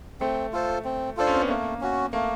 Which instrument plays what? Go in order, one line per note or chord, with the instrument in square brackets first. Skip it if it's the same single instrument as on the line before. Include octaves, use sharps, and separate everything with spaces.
[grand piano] A3 [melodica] C4
[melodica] F4 A4 C5
C4
[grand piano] D4 [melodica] F4 A4 C5
[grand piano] C#4
C4
B3
[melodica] A3 [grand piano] A#3
[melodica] C#4 F#4
[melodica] A3 [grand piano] A#3